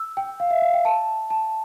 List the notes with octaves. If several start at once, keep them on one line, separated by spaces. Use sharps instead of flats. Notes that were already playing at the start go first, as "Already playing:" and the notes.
Already playing: E6
G5
F5
E5
F5
G5
A5
A5